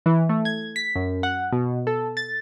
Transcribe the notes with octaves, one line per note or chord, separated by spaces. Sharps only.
E3
A3
G#6
B6
F#2
F#5
B2
A4
A6